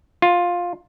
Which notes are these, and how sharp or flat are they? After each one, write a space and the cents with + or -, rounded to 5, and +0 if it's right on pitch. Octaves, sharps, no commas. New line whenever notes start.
F4 +10